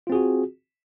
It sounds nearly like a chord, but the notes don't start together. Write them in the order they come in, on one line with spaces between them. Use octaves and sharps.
F4 C4 G#4 F#4